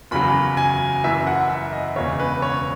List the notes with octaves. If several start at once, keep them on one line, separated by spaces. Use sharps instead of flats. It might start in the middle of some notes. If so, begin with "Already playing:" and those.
F#1 E2 C#3 F#3 B5
G#5
F#1 F#2 E3 E5
F#5
E5
D#5
E1 E2 C#3 C#5
B4
C#5